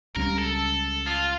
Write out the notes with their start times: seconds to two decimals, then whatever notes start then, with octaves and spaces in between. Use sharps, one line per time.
0.15 C#2 C#3 G3 C#4 A#4
0.38 A4
1.07 F4